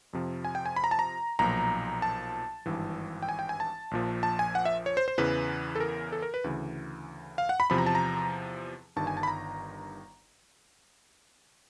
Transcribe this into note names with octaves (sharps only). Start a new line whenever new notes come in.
F2 C3 F3
G#5
G5
G#5
B5
A#5
A5
A#5
B1 A#2 F3 A#5
A5
G#1 G2 E3
G5
G#5
G5
G#5
A5
A#1 A#2 F3
A5
G#5
F#5
E5
C#5
C5
C5
E2 C#3 E3 B4
A4
A#4
A4
A#4
B4
D2 C#3 E3
F5
F#5
B5
E2 C3 F3 B5
A#5
A5
A#5
G1 G2 D#3 A5
G#5
A5
B5
A#5